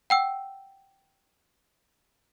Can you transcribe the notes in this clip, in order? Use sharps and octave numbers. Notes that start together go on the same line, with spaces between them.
F#5 G5 E6